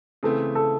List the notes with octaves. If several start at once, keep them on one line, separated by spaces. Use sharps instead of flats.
C#3 E3 A3 C4 A4
A4